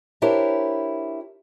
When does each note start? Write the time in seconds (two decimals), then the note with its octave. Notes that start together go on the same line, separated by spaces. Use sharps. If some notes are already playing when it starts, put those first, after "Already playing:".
0.22 D4 E4 G4 A#4 C5 C#5